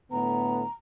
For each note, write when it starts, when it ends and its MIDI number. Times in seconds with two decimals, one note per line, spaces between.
0.11 0.63 45
0.11 0.63 50
0.11 0.63 59
0.11 0.70 82